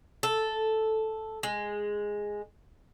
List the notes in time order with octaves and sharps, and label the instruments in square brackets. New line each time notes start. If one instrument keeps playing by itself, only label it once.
[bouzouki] A4
G#3